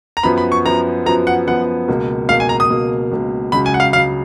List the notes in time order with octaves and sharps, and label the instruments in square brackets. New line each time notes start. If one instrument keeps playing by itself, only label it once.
[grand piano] A#5
[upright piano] F#2 F3 B3 [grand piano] B5
[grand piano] B5
C#6
[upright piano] F#2 F3 B3 [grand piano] A#5
[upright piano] F#2 F3 B3 [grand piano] A#5
[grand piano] F#5
[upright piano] F#2 F3 B3 [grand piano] F#5
[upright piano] C#2 B2 A#3
[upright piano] C#2 B2 A#3 [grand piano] F5
[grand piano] G#5
A#5
D#6
[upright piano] C#2 B2 A#3
C#2 B2 A#3
[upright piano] C#2 C#3 F#3 [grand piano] B5
[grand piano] G#5
F#5
F5
[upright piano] C#2 C#3 F#3 [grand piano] F5